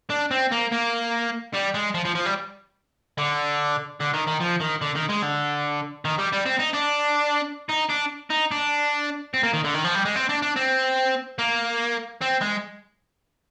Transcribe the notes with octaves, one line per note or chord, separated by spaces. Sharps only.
D4
C4
A#3
A#3
G3
G#3
F3
F3
F3
G3
D3
D3
D#3
D#3
F3
D#3
D3
D#3
G#3
D3
D#3
G3
G3
C4
D#4
D4
D#4
D4
D#4
D4
C4
A#3
D#3
D3
D#3
F3
G3
G#3
C4
D4
D4
C4
A#3
C4
G#3